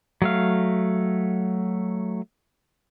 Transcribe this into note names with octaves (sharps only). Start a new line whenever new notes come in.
F#3 A3 F5